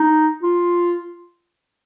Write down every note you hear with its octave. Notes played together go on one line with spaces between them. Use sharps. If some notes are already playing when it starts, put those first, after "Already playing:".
Already playing: D#4
F4